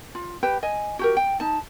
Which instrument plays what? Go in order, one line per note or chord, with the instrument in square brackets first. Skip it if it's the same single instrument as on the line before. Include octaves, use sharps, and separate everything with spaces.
[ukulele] F4
G4 B4 G5
D#5 G#5
F#4 G4 A#4
G5
D#4 A5